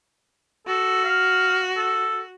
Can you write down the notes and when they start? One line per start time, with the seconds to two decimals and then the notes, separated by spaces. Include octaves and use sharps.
0.67 F#4 A4
1.04 F5
1.77 A4